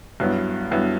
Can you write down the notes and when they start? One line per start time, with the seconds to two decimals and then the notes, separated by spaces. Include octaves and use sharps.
0.20 G2 F#3 B3 E4
0.71 G2 F#3 B3 E4